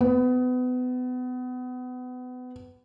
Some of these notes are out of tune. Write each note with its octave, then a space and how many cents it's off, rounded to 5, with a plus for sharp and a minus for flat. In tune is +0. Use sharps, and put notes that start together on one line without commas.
B3 +30